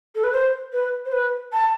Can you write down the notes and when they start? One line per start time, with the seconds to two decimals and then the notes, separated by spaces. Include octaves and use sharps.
0.15 A4
0.24 B4
0.32 C5
0.73 B4
1.05 C5
1.12 B4
1.53 A5